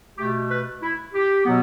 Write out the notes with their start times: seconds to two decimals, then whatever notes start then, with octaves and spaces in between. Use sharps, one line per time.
0.18 B2 A3 G4
0.50 B4
0.83 E4
1.14 G4
1.46 B2 F#3 B3